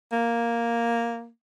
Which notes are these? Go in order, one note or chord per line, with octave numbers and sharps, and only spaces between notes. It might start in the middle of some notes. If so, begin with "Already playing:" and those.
A#3